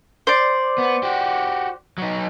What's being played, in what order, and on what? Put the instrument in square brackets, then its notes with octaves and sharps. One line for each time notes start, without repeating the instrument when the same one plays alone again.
[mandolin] C5 D5
[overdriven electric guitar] B3
F#4 G4
F#3 D#4